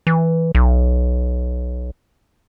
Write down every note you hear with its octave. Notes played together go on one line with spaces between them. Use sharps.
E3
B1